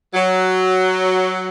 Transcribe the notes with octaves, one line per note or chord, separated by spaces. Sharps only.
F#3